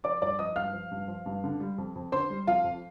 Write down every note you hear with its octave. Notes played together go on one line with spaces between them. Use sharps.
F3 D5 D6
G2 D5 D6
F3 D#5 D#6
G2 F5 F6
F3
G2
F3
G2
D3
G3
F2
F2
D3 C5 C6
G3
F2 F4 F5
F2